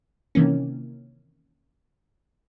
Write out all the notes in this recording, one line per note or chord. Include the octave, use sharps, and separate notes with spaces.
C3 D#3 E3 A#3 C#4